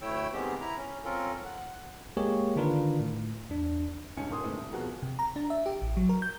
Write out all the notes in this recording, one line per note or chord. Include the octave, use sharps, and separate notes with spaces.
D2 A3 E4 C#5 G5 E6
D#3 G#3 B3 C4 G4
E4 A#5
C#4
C4 C#4 F4 A4 A#4
F#5
G#3 A#3 G4 G#4 C#5
D3 D#3 D4 F4 A#4 B4
A2
E2 D4
C#2 G2 C#4 G#5 C#7
D#1 D#3 A#3 C6 D#6
A2 D3 G#3 A3 B3 C4
C2
B2 F3 F#4 G#4 A#4
C3
A#5
D4
E5
G4
A1
F#3
A#4
G6